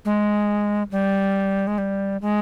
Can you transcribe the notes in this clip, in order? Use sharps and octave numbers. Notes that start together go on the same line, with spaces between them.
G#3
G3
G#3
G3
G#3